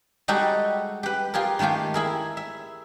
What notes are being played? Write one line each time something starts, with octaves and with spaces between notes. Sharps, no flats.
G3 G#3 D#4 F#4 G4 A4
G4 B4
F4 G4 G#4 A#4
D#3 G#3 A3 F4 G4
E4 G#4 A#4
E5